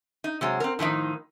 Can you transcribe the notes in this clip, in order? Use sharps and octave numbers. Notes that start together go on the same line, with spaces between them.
D#4
C3 F#3 G#3
C4 A#4
A2 D#3 F3 D#4